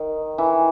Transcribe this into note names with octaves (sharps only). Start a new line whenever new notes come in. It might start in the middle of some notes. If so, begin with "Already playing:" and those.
Already playing: D#3
E3